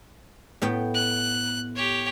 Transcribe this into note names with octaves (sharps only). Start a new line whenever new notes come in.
A2 B3 G5
F#6
G4 C#5